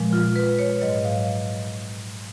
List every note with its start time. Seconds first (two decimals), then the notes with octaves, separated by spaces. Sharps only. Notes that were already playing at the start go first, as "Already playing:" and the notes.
Already playing: A#2 F3 G#3
0.13 F4
0.36 B4
0.59 C#5
0.81 G#2 F#3 D#5
1.05 F5